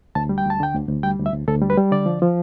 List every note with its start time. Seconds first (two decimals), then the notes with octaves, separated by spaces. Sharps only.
0.15 D2 A5
0.29 G3
0.38 G5
0.45 D2 A5
0.60 D3 G5
0.75 D2
0.89 D2
1.03 G3 G5
1.19 D2
1.26 E5
1.33 D2
1.48 D2 A4
1.62 G3
1.70 B4
1.78 G3
1.92 D3 D5
2.06 F3
2.22 F3